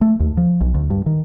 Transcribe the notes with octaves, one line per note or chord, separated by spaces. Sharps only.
A3
D#2
F3
B1
D2
G2
D#3